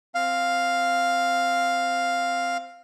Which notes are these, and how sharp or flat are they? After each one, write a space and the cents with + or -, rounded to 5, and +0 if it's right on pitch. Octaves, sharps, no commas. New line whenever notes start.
C4 +0 F5 +0